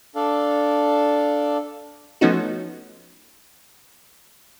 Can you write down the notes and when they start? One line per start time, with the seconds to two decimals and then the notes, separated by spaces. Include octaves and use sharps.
0.15 D4 A4 D5 F5
2.21 F3 A3 B3 C#4 D#4 F#4